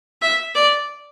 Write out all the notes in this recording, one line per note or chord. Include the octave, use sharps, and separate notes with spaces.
E5
D5